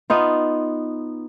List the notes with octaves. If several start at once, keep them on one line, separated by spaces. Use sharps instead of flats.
B3 D#4 F4